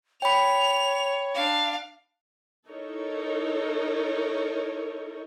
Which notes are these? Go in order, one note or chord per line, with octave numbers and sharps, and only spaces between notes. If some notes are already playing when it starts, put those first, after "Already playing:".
C#5 G5 B5 F7
D4 F5
D#4 E4 A4 A#4 C#5